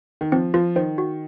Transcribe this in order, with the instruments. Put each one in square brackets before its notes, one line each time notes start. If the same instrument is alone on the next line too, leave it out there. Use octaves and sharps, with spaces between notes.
[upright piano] D#3
[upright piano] F3 [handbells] C4
[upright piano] F3 [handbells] F4
[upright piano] D#3 [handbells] C5
[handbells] F#4